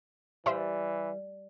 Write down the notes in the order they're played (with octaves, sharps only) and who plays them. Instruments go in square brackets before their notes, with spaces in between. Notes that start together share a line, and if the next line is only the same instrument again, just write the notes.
[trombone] E3 [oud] G3 [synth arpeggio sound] C5 E5 F5